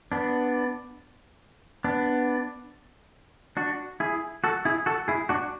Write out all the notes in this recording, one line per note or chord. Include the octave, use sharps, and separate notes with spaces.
B3 D4
B3 D4
D4 F#4
E4 G#4
F#4 A4
E4 G#4
F#4 A4
E4 G#4
D4 F#4